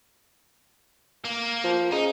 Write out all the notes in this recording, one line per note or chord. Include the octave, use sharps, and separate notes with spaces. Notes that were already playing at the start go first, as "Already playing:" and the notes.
A#3
F3
C#3 D#4